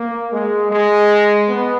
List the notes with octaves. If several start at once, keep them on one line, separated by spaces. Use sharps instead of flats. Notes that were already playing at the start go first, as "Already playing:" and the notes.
Already playing: A#3
G#3
G#3
B3